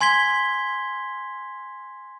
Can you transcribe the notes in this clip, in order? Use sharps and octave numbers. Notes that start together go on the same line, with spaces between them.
G#5 C6 G#6 B6 G7